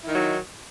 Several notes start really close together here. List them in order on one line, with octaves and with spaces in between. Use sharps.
E4 D#3 D#4 F#3